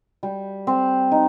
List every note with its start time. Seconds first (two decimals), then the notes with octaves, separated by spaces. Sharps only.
0.23 G3
0.67 C4
1.12 D#4